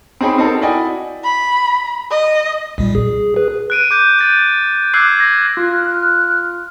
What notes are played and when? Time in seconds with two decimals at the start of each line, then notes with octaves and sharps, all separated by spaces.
0.21 C4 D#4 G#4 C#5 G5 B5
0.38 C4 D#4 F#4 A4 A#4
0.61 E4 F#4 D5 D#5 G5 G#5
1.24 B5
2.11 D#5
2.78 B1 A#2 G3
2.95 G#4
3.36 G#4 B4
3.70 F#6 D7 D#7
3.91 D6 G6
4.19 G6 A6 D#7
4.94 D6 E6 F#6 G#6 C7
5.20 G#6 A#6
5.57 F4 F6 F#6